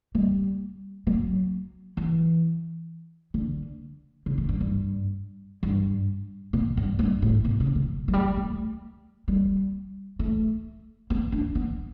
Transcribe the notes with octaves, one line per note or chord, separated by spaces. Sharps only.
G3
F#3
E3
D3
C#3
A2
G2
G2
G2
B2
G2
G2
A2
B2
C#3
B2
F#3
G3
A3
G3
A3
B3
D4
B3